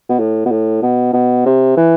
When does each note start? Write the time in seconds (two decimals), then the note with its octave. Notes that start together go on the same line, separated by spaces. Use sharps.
0.09 B2
0.19 A2
0.45 B2
0.51 A2
0.82 B2
1.14 B2
1.46 C3
1.77 E3